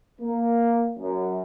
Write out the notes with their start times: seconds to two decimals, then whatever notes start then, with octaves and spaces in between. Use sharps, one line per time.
0.21 A#3
0.98 F#2